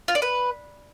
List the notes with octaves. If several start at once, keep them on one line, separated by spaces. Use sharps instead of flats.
F4
D5
B4